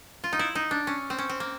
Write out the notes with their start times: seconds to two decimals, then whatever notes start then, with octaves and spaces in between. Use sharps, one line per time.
0.24 F4
0.33 D#4
0.39 E4
0.55 D#4
0.71 D4
0.87 C#4
1.10 C4
1.18 C#4
1.29 C4
1.40 A#3